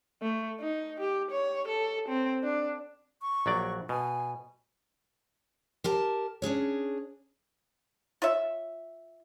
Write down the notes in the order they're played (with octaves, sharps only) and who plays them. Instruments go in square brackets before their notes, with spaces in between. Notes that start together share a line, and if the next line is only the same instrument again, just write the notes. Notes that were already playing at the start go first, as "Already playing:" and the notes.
[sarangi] A3
D#4
G4
C#5
A4
C4
D4
[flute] C#6
[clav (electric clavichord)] A#1 F#3 D5
[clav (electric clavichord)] B2 [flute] G#5
[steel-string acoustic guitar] G4 A#4 A5
C#4 D4 G#4 C#5
[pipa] F4 C#5 E5